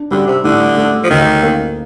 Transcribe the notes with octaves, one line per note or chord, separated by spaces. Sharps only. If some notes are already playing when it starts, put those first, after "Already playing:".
Already playing: D4
D3 G3
C3
A2 D3
A3
F3
D2 D#3
A#3